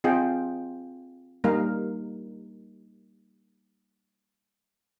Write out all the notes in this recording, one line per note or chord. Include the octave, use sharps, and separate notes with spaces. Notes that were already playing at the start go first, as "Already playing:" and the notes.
C4 F4 G#4 D#5 G5
G3 A#3 D#4 A#4 F5